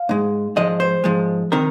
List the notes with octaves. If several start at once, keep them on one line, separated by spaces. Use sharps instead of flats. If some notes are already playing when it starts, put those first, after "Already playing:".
Already playing: F5
G#2 G#3
G#2 F3 G#3 D#5
C5
G#2 F3 G#3
C3 D#3 A#4